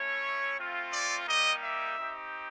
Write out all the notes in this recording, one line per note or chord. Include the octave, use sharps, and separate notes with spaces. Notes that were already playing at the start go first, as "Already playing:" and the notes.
Already playing: A3 C#4 E4 C#5
A3 C4 F4
D5
G3 A#3 D#4 G4 D#5
E5
C4 D#4 G4